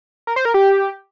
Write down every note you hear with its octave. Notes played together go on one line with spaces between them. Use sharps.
A#4
C5
A#4
G4